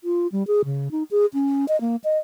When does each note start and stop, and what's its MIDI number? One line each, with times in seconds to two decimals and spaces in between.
0.04 0.27 65
0.32 0.46 55
0.47 0.62 68
0.65 0.91 49
0.91 1.03 63
1.11 1.26 68
1.34 1.65 61
1.68 1.79 75
1.81 1.96 58
2.04 2.18 75